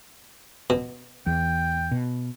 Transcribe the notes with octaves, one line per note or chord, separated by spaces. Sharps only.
B2
E2 G5
B2